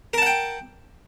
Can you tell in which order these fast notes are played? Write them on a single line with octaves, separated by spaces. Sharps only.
A#4 A5 F#5 G5